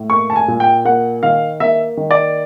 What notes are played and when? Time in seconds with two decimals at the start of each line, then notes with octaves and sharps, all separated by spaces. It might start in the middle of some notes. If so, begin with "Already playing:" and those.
Already playing: A2
0.10 A#3 C#6
0.30 A5
0.36 G#5
0.48 A#2
0.60 G5
0.85 A#3 F#5
1.23 D#3 F5
1.60 A#3 E5
1.97 D#3
2.11 D5